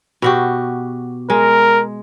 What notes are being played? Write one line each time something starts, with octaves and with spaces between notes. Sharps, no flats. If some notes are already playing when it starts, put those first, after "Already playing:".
B2 F#4 G4
G#3 A#4